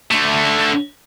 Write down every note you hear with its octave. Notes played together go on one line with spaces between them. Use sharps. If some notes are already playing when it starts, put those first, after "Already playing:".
D3 A3